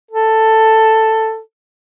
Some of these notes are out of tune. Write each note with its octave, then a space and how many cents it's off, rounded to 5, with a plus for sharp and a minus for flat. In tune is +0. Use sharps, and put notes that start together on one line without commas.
A4 +10